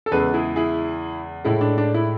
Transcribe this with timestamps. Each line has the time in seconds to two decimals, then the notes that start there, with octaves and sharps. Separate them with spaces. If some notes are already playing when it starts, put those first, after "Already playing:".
0.06 A4
0.11 E2 C#3 G#3 G#4 B4
0.34 E4 G#4
0.56 E4 G#4
1.45 A2 G#3 E4
1.61 D4
1.78 D4
1.94 E4